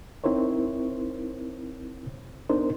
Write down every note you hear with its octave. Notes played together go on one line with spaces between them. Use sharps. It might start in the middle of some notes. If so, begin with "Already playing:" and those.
C4 D#4 E4 A#4 C5 C#5
B3 D4 D#4 A#4 C5